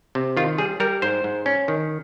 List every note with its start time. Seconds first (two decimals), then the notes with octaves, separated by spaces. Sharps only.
0.15 C3
0.37 D#3 F4
0.58 G3 G#4
0.80 G3 A#4
1.02 G#2 C5
1.24 G#2
1.46 C#4
1.68 D#3